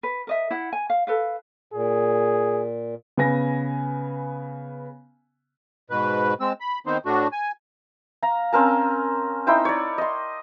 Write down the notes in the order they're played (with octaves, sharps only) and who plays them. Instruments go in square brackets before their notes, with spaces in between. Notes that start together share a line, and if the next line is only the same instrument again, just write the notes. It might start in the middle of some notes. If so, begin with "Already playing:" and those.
[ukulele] B4
A#4 D#5 E5
E4 F#5
G#5
F5
A4 B4 F5
[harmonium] A#2 [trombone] G#4
[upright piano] C#3 B3 G#5 A#6
[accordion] G#2 B2 B4
G#3 C4 E6
B5
D#3 B3 C4 D#4 C5
A2 A3 D4 F#4
G#5
[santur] F5 A#5
C4 C#4 A#4 A5
D#4 E4 C5 G5
C#5 D5
D#5 C6